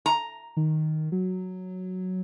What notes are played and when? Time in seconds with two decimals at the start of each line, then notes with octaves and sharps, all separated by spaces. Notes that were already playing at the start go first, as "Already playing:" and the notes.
0.06 A#5
0.57 D#3
1.12 F#3